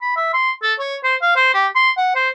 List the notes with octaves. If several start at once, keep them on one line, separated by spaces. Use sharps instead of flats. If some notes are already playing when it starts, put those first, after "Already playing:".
B5
E5
C6
A4
C#5
C5
F5
C5
G4
C6
F#5
C5